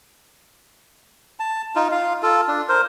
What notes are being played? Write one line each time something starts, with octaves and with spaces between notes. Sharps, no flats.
A5
D#4 F4
F4 F5
F4 A4
D4
A#4 C5